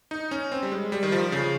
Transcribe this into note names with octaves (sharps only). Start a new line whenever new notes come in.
D#4
C#4
C4
G3
G#3
G3
D#3
F3
C#3